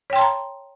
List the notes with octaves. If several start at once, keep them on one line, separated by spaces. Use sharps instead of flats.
C#5 G5 A5 A#5 C6